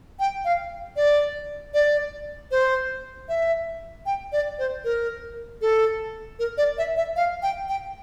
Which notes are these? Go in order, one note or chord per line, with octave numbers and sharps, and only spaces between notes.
G5
F5
D5
D5
C5
E5
G5
D5
C5
A#4
A4
A#4
D5
E5
E5
F5
G5
G5